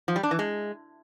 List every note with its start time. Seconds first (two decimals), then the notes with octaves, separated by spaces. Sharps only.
0.08 F3
0.16 G3
0.23 D4
0.31 E3
0.39 G#3